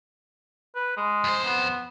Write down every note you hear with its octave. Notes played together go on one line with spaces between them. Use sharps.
B4
G#3
F2 C5
B3